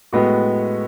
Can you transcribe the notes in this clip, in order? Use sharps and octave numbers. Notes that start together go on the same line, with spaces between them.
A2 G#3 B3 F#4